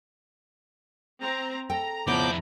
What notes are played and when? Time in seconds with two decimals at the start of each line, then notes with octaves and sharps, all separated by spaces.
1.21 C4 A#5
1.70 A4 G5 A#5
2.07 F2 C#3 F3 B3 E4 C5 D6 G6